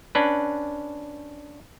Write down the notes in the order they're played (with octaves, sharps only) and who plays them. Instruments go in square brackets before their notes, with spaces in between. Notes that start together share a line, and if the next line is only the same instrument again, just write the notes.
[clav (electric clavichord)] C#4 D4 B4